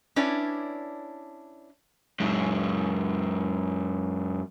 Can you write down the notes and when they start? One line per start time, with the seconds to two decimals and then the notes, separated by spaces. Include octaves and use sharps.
0.16 C#4 D4 E4 B4 C#5 D5
2.20 F#2 G#3